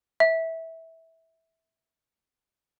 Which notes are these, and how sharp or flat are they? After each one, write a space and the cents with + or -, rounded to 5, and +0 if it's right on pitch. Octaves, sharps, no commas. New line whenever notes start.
E5 -15